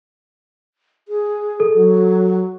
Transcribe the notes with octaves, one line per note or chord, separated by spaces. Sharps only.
G#4
A4
F#3